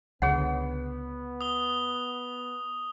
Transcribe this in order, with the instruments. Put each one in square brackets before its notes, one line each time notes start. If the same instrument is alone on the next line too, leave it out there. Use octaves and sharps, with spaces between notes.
[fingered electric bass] C#2 D3 [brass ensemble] B3 [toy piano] G#4 C#5 F#5
[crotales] D#6 G7